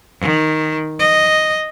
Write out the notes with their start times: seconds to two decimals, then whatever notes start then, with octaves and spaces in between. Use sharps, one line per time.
0.20 D#3
1.00 D#5